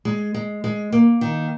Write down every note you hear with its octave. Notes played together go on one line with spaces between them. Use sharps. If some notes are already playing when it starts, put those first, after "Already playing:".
G#3
G#3
G#3
A#3
D#3